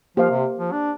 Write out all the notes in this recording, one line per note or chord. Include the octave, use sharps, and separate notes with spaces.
F3 A#3 G4 C5 F5
C3
F3
D4